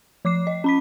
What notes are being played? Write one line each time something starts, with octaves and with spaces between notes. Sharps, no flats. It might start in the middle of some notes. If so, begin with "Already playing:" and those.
F3 D6 C7
D#5
C#4 B5 B6